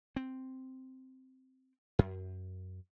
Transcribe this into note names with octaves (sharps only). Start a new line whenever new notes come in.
C4
F#2